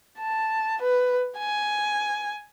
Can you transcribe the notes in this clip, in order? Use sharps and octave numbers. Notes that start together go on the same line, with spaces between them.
A5
B4
G#5